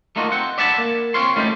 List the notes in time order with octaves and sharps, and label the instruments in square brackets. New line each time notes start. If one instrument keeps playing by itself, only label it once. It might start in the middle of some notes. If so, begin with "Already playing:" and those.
[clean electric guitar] A3 A#3 D#4 F4 F#4
C4 F#5
D5 E5 F#5 A5 B5
A#3
C4 C#5 F5 C6
G3 A3 C#4 D#4 F4